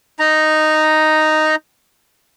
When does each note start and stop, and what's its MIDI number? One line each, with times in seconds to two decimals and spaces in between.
0.19 1.55 63
0.19 1.55 82